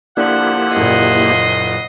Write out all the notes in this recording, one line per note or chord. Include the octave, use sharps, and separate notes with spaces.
D3 F3 A#3 D4 E4 G4 F#5
F#1 A#2 D#5 C7